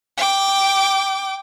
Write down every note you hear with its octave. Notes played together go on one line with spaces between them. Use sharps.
G5 D6